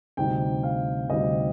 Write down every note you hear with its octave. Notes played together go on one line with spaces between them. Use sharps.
D2 C3 G3 C4 D#4 G5
F5
D2 C3 G3 C4 D#4 D#5